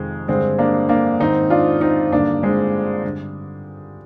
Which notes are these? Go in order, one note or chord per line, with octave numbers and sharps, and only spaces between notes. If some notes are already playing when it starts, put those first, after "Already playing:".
Already playing: F2 C3 D#3 G#3
G2 D3 G#3 C4
A#3 D4
A#3 D4
G#2 D#3 C4 D#4
D4 F4
C4 D#4
G2 D3 A#3 D4
G#3 C4
G2 D3